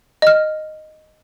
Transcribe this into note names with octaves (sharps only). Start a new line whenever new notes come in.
D#5 F6